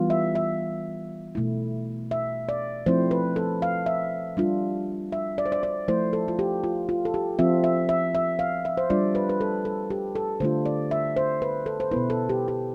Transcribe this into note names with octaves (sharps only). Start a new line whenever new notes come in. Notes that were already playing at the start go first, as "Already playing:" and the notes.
Already playing: E3 G3 B3 F4
E5
E5
B2 A3 E4
E5
D5
F3 A3 C4 E4 C5
B4
A4
F5
E5
G3 D4 F4
E5
D5
C5
D5
D5
F3 A3 E4 C5
A4
F4
G4
F4
F4
A4
G4
F3 C4 F4 E5
E5
E5
E5
F5
E5
C5
G3 D4 F4 D5
B4
B4
A4
A4
G4
A4
D3 A3 D4 F4 C5
D5
E5
C5
B4
A4
C5
B2 B3 E4 B4
A4
G4
G4